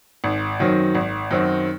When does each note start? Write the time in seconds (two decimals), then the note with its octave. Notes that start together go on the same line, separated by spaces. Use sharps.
0.24 G#1
0.60 F#2 D#3 F#3 C4
0.95 G#1
1.31 F#2 D#3 F#3 C4